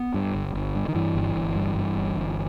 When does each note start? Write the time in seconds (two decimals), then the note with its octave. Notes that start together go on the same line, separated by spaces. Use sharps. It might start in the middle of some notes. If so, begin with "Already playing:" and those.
Already playing: B3
0.14 G2
0.34 G1
0.55 G1
0.75 G2
0.88 D#3
0.95 G2 E3
1.15 G1
1.35 G1
1.56 G2
1.76 G2
1.96 G1
2.16 G1